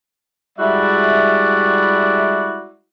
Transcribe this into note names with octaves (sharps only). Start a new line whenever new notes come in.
G3 G#3 E4 F#4 D5 E5